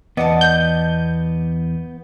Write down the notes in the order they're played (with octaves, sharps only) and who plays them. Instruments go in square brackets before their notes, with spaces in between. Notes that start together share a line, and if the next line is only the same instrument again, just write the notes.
[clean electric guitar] E2 D5 [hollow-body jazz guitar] B3 F#5 [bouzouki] D#5 A5
[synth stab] G6